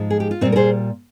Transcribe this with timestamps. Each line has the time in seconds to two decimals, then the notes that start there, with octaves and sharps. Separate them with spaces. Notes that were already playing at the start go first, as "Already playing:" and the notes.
Already playing: G#2 F3 G#3
0.10 G#4
0.20 G4
0.31 F4
0.41 A#2 G3 C4 D#4
0.52 A#4
0.56 G#4 C5